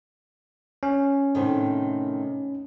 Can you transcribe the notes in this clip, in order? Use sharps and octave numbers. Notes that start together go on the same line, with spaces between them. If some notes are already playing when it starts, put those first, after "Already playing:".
C#4
A2 C3 D#3